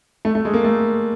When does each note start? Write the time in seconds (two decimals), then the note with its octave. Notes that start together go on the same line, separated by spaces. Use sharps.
0.25 A3
0.35 A3
0.45 G#3
0.54 A#3
0.64 A3